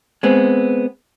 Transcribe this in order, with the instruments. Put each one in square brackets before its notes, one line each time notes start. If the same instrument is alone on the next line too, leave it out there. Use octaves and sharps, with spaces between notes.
[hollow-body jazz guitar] G#3 B3 C4